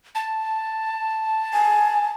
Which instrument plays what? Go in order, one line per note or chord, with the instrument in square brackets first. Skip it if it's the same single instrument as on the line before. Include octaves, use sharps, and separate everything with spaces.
[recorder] A5
[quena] G#5